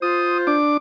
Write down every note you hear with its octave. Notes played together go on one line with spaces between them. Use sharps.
F4 C5 D#6
D4 D6